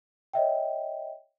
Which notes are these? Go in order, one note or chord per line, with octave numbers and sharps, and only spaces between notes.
C#5 D#5 E5 G5